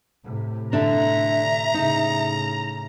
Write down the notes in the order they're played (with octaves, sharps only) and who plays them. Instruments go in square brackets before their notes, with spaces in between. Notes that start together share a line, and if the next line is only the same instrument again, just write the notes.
[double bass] A2 C3
[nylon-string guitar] D3 D4 [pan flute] E5 [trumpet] A#5
[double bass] A2 C#3 [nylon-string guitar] D#4